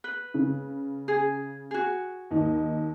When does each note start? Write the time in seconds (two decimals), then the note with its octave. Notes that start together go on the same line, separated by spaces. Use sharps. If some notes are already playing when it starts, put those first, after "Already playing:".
0.04 B4
0.34 C#3
1.08 G#4
1.71 F#4 G#4
2.31 D#2 D#4